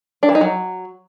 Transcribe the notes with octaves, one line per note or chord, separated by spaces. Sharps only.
D4
E3
D#4
F#3